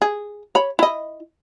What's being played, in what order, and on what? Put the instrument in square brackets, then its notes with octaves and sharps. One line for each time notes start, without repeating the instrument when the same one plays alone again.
[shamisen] G#4
C#5 B5
E4 D#5